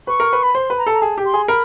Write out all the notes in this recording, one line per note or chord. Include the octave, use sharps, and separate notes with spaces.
B4 C#6
A#4
B4
B5
C5 C6
B4
A#5
A4
A#5
G#4 A5
G4
C6
G#4
A#4 B5